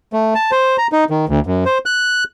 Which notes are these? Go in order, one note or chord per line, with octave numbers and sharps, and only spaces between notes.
A3
A5
C5
A#5
D#4
D#3
D2
F#2
C5
F#6